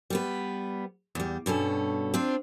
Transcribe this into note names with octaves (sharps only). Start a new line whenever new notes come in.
G3 B3 B4
E2 G3
G2 B2 C#4 A4
C4 D4 F4